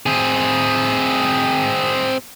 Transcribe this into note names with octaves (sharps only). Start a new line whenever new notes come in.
C4 G#4